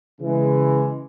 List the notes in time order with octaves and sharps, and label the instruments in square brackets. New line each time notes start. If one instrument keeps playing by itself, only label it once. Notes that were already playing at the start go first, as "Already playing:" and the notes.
[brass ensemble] C#3 E3 G#3